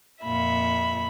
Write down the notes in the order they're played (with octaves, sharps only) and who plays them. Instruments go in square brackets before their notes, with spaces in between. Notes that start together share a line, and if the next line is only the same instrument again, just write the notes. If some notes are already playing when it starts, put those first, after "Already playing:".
[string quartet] F2 A#2 E5 [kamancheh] B5